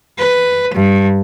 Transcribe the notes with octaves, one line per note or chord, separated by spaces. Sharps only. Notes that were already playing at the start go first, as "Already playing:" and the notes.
B4
G2